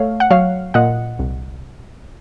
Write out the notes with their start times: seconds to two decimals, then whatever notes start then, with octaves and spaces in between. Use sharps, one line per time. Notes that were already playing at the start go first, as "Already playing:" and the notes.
Already playing: A3 C#5 F5
0.20 F#5
0.30 F#3 C#5 F5
0.74 A#2 D#5 F#5
1.19 C2